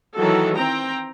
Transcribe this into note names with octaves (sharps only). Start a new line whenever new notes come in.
D#3 E3 F#3 F#4 A4
C4 G5 A#5